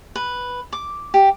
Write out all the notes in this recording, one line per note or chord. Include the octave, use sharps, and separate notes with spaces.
B4
D6
G4